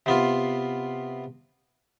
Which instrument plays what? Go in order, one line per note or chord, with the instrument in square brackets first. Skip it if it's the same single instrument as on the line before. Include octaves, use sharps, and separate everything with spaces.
[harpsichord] C3 B3 F4